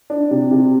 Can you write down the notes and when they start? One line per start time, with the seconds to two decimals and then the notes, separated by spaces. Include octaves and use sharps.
0.10 D4
0.31 C3
0.51 C3